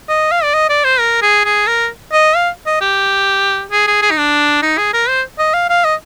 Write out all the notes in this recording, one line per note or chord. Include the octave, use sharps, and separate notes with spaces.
D#5
F5
D5
D#5
D5
C5
A#4
G#4
G#4
A#4
D#5
F5
D#5
G4
G#4
G#4
G#4
D#4
D4
D#4
G#4
A#4
C5
D#5
F5
F5
D#5